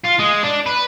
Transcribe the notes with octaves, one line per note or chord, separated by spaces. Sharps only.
F4
G#3
D4
B4